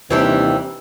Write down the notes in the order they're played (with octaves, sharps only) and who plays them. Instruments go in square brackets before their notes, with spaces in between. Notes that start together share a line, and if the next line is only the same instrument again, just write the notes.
[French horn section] D#2 C3 C5 [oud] E3 G3 D4